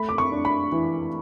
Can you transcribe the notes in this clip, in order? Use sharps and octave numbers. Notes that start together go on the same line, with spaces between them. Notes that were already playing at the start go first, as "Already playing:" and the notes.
Already playing: A3 B5
D6
C#6
D4
B5
E3